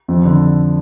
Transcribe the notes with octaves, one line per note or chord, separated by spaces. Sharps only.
F2
D3